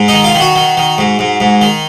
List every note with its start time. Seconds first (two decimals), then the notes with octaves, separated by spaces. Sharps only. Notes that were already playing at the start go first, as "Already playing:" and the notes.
Already playing: G#2
0.08 D#4
0.14 D#3
0.24 F4
0.35 D#3
0.40 F#4
0.56 D#3
0.77 D#3
0.98 G#2
1.19 G#2
1.40 G#2
1.61 D#3